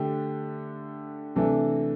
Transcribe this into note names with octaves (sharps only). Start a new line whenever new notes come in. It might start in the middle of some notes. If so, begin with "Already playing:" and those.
Already playing: D3 A3 D4 G4
C3 E3 A3 D4 A4